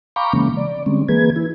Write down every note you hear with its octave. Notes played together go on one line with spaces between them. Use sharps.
F5 G5 A#5 B5 C#6 D6
C#3 E3 G#3 A#3 C#4
D5
D3 G3 G#3 C4 C#4
E3 A#3 G#4 B4 G#6
E4